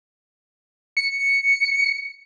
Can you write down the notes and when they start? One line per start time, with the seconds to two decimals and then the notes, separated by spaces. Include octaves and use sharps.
0.97 C#7